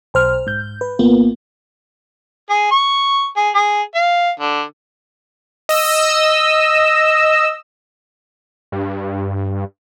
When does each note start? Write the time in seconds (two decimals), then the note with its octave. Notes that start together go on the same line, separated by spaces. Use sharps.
0.14 B1 C5 F6
0.47 G#2 G6
0.81 B4
0.99 G#1 A#3 B3 F4
2.50 G#4
2.71 C#6
3.36 G#4
3.55 G#4
3.95 F5
4.39 D3
5.69 D#5 E6
8.72 G2